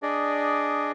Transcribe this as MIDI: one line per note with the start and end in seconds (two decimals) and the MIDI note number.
0.03 0.92 62
0.03 0.92 68
0.03 0.92 74
0.03 0.92 75